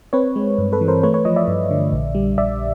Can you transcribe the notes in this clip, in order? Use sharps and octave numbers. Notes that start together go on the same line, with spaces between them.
C4 B4 C#5
G#3
G2
A4 B4
E3
A#4 C5
A3 B4 C#5
B4 C#5
F3 C#5 D#5
D5 E5
G2
D3
A#1
G3
A#1 D5 E5